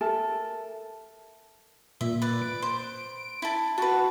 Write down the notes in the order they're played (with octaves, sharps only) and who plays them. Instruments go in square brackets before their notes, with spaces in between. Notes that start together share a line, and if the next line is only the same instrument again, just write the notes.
[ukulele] A4 A#4 E5 A5
[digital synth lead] A#2 [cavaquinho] E5
[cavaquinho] B4 D5
[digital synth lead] D7
[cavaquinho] C5
E4 A5
[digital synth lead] F#4 [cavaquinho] B4 A5